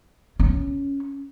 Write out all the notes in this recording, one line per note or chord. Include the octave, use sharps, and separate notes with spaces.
C#4